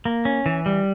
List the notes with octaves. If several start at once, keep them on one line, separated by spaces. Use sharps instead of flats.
A#3
C#4
E3
G3